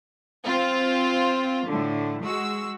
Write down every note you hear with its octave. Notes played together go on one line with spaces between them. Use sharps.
C4 F4
A2 D3
G#3 F#4 E6